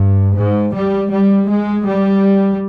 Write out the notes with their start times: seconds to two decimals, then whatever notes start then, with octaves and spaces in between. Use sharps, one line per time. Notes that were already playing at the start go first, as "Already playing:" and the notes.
Already playing: G2
0.37 G#2
0.75 G3
1.11 G3
1.49 G#3
1.86 G3